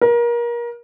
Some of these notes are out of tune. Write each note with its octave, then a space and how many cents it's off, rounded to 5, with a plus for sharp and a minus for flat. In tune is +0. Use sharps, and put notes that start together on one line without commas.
A#4 +30